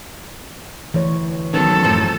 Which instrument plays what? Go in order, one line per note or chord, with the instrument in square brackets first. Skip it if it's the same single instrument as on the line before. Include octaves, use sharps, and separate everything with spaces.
[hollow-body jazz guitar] D2 [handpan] E3 C#5
[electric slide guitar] D#3 F#3 [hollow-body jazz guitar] B3 C#4 [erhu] A4
[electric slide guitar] F#2 A2 F#3 [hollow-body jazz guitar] D#3 F3 C4